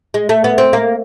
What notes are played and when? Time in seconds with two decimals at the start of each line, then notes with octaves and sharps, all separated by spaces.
0.14 G#3
0.29 A3
0.44 B3
0.58 C4
0.73 A#3